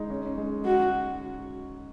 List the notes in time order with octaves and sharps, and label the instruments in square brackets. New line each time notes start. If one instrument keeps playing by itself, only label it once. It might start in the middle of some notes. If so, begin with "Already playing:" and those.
Already playing: [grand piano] G#3 D#4
C#4
G#3
[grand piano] G#3 [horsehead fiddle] F#4